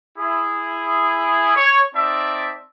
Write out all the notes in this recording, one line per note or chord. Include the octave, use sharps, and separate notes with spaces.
E4 G#4
C#5
C4 D#4 D5 E5 A5